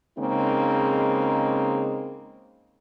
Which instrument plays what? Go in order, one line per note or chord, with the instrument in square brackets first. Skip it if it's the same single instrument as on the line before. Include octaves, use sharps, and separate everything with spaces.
[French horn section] C#3 G#3 A#3 C4 D#4